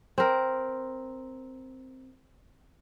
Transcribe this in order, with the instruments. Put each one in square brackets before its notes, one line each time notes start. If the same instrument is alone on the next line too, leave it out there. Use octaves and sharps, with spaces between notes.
[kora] C4 A#4